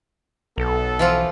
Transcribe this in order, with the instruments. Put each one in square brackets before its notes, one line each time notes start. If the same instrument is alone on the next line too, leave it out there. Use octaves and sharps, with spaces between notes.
[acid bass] B1 [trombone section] B3 A4
[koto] E3 F3 F4